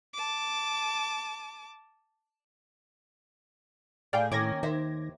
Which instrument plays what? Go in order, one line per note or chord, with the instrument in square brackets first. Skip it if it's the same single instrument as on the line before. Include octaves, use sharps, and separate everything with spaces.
[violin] A5 D6
[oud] A2 G#4 [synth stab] D5 F5 G5
[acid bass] A2 [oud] D#3 A#3 C#4 [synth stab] D6 G#6 A#6
[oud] D#2 C5 E5 [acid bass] D#3